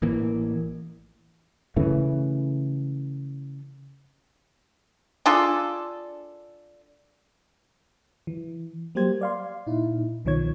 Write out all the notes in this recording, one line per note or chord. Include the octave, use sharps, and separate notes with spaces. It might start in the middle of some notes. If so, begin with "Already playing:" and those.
A1 E3 A#3
C#3 E3 A3
D4 F4 G#4 A4
E3
F#3 G3 A#3 G4 C5 G#6
D5 F5 C6
A#2 D#4 E4
C2 B2 D#3 F3 C#5 G#6